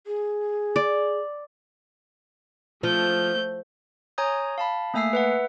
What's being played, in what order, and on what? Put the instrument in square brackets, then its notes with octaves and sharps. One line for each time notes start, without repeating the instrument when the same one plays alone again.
[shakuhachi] G#4
[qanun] D5
[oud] F3 [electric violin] A3 G6
[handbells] C#5 G#5 A#5 D#6 G6
F5 A5 B5
A3 A#3 E5 G#5 E6 C7
B4 E5 F#5